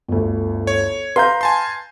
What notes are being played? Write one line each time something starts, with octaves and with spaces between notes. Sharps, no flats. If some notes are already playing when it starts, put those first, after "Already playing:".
G1 D2
C#5
B4 F5 A#5 C6 G6
G#5 A5 C6